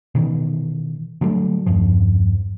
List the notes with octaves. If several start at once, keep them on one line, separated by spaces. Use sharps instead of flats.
B2 D#3 E3
D3 F#3 G3 A3
G1 E2 G2 F3